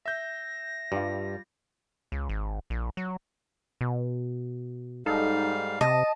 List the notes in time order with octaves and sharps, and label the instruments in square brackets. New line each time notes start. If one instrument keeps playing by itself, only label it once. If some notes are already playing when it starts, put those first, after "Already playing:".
[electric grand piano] E5 G6 [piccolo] A#6
[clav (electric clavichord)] G2 [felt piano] G3 F4
[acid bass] C#2
G#1
A#1
F#3
B2
[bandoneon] G#2 G3 F5 [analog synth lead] D#4 [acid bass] A4
[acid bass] C3 [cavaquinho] D#5 [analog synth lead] A5